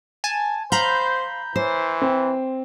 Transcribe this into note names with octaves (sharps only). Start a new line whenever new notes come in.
G#5 A5
C5 F5 A#5 B5 G6
E3 C5
C4